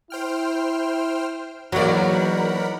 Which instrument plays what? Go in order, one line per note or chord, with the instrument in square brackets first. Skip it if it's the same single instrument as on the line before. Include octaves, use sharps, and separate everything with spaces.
[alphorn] E4 [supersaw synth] C5 G5 F6
[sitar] E2 D5 [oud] F#3 A#3 [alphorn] D#4 [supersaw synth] A#4 F#5 B5